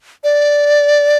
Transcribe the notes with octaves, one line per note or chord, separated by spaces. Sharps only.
D5